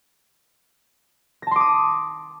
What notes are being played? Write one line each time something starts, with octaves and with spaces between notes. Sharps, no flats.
A5 C6 D6 D#6 A#6